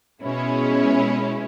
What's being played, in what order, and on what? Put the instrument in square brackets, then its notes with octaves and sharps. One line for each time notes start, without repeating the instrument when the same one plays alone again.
[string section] B2 G#3 C#4 E4